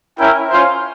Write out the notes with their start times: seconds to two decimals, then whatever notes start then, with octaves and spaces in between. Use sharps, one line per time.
0.18 C#4 E4 A#4 E5 G5
0.50 C#4 F4 C5